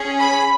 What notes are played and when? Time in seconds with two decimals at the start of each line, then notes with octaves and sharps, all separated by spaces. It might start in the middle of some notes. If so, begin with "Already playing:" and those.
Already playing: C#4 G#4
0.20 B5